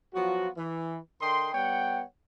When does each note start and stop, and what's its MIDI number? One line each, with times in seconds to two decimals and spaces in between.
0.14 0.49 53
0.14 0.49 54
0.14 0.49 59
0.14 0.49 65
0.14 0.49 66
0.57 0.97 52
1.21 1.51 50
1.21 1.51 70
1.21 1.51 75
1.21 1.51 79
1.21 1.51 84
1.53 2.03 55
1.53 2.03 59
1.53 2.03 73
1.53 2.03 78
1.53 2.03 79